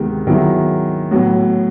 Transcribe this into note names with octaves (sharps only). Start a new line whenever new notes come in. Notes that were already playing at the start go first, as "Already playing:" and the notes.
Already playing: D2 C3 D#3 G#3 B3
D#3 F#3 B3 E4 G#4
A2 F#3 B3